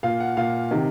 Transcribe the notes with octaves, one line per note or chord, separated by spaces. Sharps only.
A#2 F5
F#5
A#2 F5
C3 D#3